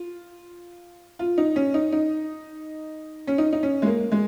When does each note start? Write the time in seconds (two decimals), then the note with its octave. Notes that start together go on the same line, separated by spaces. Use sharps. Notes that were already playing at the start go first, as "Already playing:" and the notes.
Already playing: F4
1.19 F4
1.38 D#4
1.56 C#4
1.74 D#4
1.92 D#4
3.27 C#4
3.38 D#4
3.53 D#4
3.63 C#4
3.82 G#3
3.86 A#3
4.12 G#3